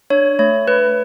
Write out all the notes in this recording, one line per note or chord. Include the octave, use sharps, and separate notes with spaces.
D4 C#5
A3 C#5
A3 B4